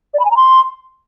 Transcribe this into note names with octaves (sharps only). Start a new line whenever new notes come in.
D5
B5
G#5
A#5
C6